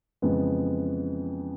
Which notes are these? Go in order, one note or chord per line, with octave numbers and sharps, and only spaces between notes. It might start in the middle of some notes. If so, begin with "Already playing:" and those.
F2 C#3 E3 G#3 B3